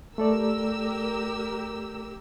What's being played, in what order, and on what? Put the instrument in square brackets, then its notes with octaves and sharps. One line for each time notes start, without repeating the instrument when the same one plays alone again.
[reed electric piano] A3 A4 D5 [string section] G4 A#4 E6